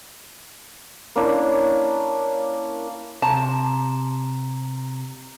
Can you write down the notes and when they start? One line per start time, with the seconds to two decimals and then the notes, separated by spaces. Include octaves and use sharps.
1.16 A#3 C#4 D4 E4
3.22 C3 A5 A#5